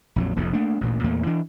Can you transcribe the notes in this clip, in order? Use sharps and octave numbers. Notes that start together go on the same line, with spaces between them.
A#1 F2 F#3
F1 A#1 F2 A2
A3 A#3 D4
A1 D2 A#2
E2 A#2 A3 A#3
E3 D4